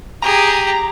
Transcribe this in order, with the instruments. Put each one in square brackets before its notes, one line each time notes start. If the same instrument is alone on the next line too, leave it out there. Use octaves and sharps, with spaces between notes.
[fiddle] G4 G#4 [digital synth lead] A#5